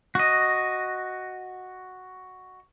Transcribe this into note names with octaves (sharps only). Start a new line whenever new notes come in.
F#4 D#5